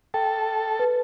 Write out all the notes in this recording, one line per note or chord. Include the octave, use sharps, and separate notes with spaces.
A4 G5
B4